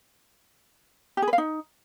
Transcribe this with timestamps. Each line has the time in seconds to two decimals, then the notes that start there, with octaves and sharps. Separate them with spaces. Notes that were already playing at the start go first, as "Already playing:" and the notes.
1.17 G4
1.22 G#4
1.28 B4
1.33 F5
1.38 D#4